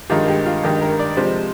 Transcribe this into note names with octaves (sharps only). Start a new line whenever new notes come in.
G2 D#3 G#3 F4
G4
F4
G2 D#3 G#3 G4
A#4
D5
C3 F3 G#3 C5